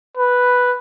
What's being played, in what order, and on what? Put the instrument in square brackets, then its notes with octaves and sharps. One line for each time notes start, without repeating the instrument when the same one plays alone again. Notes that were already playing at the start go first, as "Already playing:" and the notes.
[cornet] B4